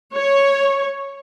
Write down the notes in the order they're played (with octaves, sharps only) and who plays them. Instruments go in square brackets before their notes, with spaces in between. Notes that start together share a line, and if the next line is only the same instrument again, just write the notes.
[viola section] C#5